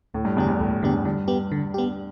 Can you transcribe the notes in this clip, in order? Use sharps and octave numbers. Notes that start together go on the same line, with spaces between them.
D2 A2
G2
E2 D3 B3 G4
G2
D2 A2
G2
E2 D3 B3 G4
G2
G2 D3
B3 G4
D3
B3 G4